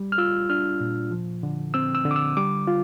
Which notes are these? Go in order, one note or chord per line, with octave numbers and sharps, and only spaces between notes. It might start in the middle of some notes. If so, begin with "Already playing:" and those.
Already playing: G3
F6
F4 E6
D4 F6
A#2
F3
D3
C4 E6
E6
D3
D6
E6
G3 D6
F4